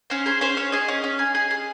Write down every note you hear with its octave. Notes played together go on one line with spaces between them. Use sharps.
C#4 C5
G#4 C5
C#4 C5
C#4 C#5
G#4 D#5
C#4
C#4
G#4
G#4
G#4